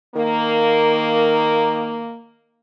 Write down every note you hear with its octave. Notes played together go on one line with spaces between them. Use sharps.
D#3 A#3